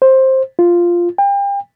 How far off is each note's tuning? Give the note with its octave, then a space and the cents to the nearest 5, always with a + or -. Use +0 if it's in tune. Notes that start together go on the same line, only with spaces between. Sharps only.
C5 +15
F4 -5
G5 +35